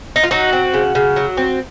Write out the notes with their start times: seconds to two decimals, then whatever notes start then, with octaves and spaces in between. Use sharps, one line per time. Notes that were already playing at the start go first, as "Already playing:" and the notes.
0.16 D#4
0.24 F4
0.31 F#3 D#4 F#4
0.53 C4
0.74 C#3
0.95 C#3
1.16 F#3
1.37 C4